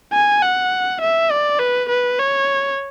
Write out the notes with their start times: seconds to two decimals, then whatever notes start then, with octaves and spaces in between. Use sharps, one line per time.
0.13 G#5
0.43 F#5
1.02 E5
1.31 D5
1.59 B4
1.89 B4
2.19 C#5